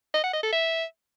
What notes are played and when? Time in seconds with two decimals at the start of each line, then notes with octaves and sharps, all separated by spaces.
0.14 D#5
0.24 F#5
0.33 D#5
0.43 A4
0.53 E5